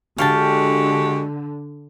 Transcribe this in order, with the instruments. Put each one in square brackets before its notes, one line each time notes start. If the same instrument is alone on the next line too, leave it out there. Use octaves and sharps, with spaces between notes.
[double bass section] D3 [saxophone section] G#3 F#4 G4 [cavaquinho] F5 G5 A5